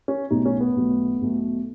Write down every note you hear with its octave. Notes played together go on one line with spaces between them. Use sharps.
C#4
B1 B2 A3 D#4
C#4
B3
B1 B2 A3
B1 B2 A3